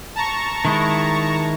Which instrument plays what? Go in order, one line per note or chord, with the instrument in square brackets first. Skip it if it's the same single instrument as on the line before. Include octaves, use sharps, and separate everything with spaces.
[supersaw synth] A5 A#5 C#6
[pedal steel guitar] D#3 G#3 E4